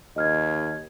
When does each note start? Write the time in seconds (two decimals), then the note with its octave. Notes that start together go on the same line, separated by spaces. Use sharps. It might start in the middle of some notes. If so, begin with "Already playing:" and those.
0.16 D#2 D#5 F6 G#6